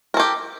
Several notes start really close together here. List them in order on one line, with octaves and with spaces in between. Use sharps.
A#4 A4 G4